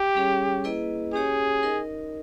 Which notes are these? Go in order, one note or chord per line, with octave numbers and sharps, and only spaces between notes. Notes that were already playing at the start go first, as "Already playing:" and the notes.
Already playing: G4
G3 C#4 G#4 C#5
A#3 E4 G#4 B4 D#5
C#4 G4 G#4 C#5
D#4 A#4 D#5